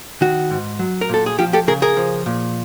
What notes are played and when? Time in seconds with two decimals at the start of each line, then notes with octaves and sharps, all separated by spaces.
0.21 D#3 F#4
0.50 G#2
0.79 F#3
1.01 A#4
1.09 A#2 A4
1.26 G#4
1.39 F3 F4 G4
1.53 G4 A4
1.67 C#3 G#4 A#4
1.82 G#4 A#4
1.97 F3
2.26 A#2